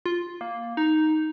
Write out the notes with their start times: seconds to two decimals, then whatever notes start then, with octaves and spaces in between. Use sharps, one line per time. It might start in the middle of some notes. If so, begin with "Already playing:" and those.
0.06 F4
0.41 A#3
0.77 D#4